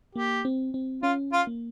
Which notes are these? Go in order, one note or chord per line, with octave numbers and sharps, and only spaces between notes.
A#3 G4
C4
C4
C#4 F4
F4
A#3